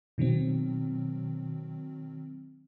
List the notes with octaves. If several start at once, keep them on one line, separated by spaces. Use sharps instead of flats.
B2 D#3 F#3 C4